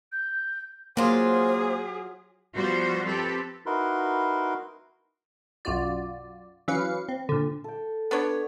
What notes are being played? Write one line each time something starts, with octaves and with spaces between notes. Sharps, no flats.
G6
F#3 A#3 F4 G#4 C5
F3 G3 B3 F#4 C5
C4 G4 A4 B4
D#4 E4 F#4 A#4 B4 C6
B1 F#2 F4 F#4 D5
E3 F#3 C#4 B4 F5 C#7
C4
A#2 D3
A4 G5
B3 D4 C#5